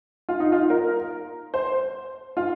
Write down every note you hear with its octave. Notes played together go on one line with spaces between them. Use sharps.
F4
D#4
F4
A#4
C5
F4